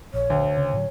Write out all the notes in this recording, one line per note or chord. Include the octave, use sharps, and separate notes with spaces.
A#1 C#5
D2
C#3
A2 D3 F#3